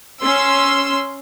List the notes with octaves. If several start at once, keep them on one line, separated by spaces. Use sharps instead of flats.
C#4 C6 E6